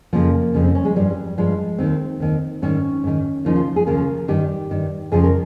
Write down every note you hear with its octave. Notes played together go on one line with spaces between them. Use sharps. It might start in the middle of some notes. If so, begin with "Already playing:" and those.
F2 C#3 F3 A#3
F2 C#3 F3
C4
C#4
G#3
G2 F3 G3
G2 F3 G#3
D#2 D#3 C4
D#2 D#3
G#2 D#3 C#4
G#2 D#3
D#2 C#3 F3 D#4
F4
G#4
D#2 C#3 F3 A#4
G2 D#3 G4
G2 D#3
F2 C#3 F3 G#4
A#4